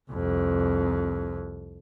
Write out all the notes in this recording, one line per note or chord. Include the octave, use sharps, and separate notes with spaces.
C2 F2